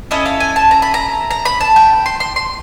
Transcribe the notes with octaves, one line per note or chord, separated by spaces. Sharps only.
C#4 E4 A4 D#5
F5
G#5
A5
A#5
B5
A#5
A#5
B5
A5
G5
C6
C6
C6